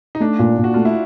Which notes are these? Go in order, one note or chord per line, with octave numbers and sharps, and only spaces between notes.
D#4
A3 D4
A#2
A#2
F#4
A3 F4
E4